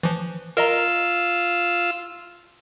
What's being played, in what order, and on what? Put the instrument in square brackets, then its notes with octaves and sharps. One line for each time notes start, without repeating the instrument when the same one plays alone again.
[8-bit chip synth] E3 F3
[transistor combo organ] F4 E6 [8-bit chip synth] A#4 D#5 A#5